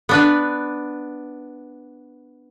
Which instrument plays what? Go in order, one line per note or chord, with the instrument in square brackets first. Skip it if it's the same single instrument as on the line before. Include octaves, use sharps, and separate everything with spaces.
[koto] B3 D4 B4